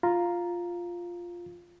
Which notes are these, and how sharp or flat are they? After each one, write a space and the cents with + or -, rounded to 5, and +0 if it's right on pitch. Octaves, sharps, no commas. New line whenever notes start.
F4 +0 A#5 +0